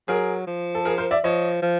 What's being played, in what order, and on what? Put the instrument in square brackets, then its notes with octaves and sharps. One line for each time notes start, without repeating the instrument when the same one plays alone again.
[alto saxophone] F#3 [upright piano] G#4 A#4
[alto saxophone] F3
[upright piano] A4
G#4 A#4
A#4 C5
D5 E5
[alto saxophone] F3 [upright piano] C#5 D#5
[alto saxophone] F3